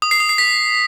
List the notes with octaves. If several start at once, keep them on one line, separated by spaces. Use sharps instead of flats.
D#6
C7
D#6
C7
B6